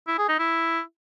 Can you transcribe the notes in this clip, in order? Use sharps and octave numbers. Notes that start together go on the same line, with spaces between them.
E4
G#4
D#4
E4